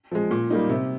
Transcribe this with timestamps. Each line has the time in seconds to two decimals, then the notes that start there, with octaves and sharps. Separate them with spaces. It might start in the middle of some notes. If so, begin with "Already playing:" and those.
0.11 F3 G#3
0.31 A#2
0.50 G3 A#3 D#4
0.70 C3